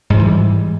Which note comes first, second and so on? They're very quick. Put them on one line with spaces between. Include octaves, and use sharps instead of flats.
G#2 F3 E3 G3